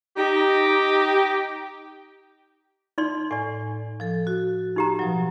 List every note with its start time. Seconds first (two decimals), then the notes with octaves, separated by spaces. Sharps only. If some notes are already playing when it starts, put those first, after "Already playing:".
0.17 D#4 G4
2.98 D#4 D5 C6
3.31 A2 D5 G#5
4.00 F3 A4
4.27 F#4
4.76 D#4 G4 A#5
4.99 B2 F3 F#3